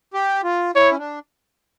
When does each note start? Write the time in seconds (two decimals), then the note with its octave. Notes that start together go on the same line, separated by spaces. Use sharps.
0.14 G4
0.44 F4
0.75 E4 C#5
0.92 C#4
0.99 D4